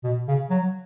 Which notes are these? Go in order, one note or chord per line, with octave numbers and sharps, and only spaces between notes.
B2
C#3
F#3